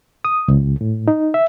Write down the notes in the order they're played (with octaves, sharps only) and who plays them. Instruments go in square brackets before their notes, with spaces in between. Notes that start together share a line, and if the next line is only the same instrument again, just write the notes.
[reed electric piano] D#6
C#2
A2
D#4
E5